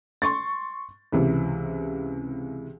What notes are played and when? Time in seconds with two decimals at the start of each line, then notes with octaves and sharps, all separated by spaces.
0.22 C6 C#6 A6
1.12 C#2 C3 E3